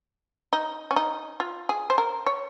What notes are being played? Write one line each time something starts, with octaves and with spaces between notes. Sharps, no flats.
D#4
C#4
D#4
F4
G#4
C5
A#4
C#5